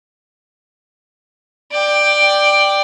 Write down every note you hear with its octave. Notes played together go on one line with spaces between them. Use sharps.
D5 G5